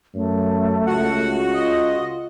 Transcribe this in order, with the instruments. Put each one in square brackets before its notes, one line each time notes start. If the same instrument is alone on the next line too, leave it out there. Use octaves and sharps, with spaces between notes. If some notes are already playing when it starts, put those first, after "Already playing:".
[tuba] F#2 [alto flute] A3
[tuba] C#2 [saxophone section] F#4 [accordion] F#5
[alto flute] F4 [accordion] D#5